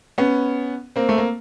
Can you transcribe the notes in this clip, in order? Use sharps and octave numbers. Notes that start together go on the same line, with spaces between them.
B3 C#4
A#3 C4
A3
A#3